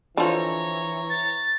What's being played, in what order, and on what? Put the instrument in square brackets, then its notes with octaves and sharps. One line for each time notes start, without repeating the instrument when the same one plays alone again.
[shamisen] D3 F3 [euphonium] E3 [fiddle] C#5 A#5
[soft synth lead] A6